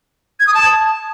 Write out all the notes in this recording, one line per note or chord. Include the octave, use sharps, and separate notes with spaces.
G#6
D#6
A5